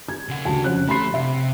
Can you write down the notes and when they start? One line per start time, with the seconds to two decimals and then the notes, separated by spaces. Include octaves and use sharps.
0.08 G#6
0.29 C#3 F#5
0.45 D2 A5
0.64 F2 C#4 F#6
0.88 A3 B5 C6 C7
1.14 C3 E5